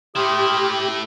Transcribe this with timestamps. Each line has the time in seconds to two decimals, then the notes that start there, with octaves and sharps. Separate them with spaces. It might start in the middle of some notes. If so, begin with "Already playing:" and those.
0.16 A3 E4 G4 C6 D#6 F6